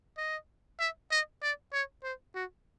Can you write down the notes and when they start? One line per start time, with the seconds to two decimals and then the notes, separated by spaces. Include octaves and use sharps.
0.17 D#5
0.79 E5
1.11 D#5
1.42 D5
1.73 C#5
2.04 C5
2.35 F#4